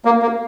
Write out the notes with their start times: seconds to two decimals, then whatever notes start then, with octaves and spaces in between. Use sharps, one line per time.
0.05 A#3
0.22 A#3